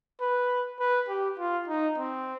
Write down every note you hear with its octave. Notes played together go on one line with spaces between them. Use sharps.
B4
B4
G4
F4
D#4
C4